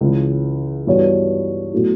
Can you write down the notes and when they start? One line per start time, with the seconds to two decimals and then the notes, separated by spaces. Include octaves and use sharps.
0.01 C#2 C#3 E3
0.87 G2 E3 B3 F#4 C#5
1.72 B2 F#3 A3 E4